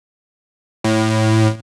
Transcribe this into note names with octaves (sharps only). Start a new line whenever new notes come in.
A2